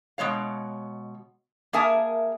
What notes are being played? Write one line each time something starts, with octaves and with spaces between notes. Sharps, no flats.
B2 G#3 C#5 F5
A#3 G#4 A#4 E5 G#5 A5